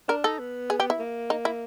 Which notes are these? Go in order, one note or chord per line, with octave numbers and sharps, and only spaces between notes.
D4 A#4
D#4 A4
B3
G#4
G4
E4
A#3
D#4
E4